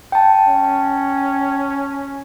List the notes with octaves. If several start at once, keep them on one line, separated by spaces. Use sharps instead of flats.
G5 A5
C#4